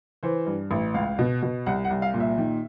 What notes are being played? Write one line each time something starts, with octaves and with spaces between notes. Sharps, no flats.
E3 C5
G2
A1
C#2 F5
B2
B2
C2 F#5
F#5
C2
F5
A#2
E5
D#3